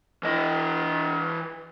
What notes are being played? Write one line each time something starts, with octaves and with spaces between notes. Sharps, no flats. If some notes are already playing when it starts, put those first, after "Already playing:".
E3 D#5